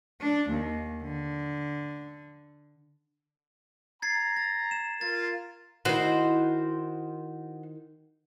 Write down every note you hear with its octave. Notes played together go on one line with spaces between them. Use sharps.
D4
D#2
D3
A#5 G#6 A6 C7
A6
E7
F4 A#4 A6
D#3 E4 F#4 C5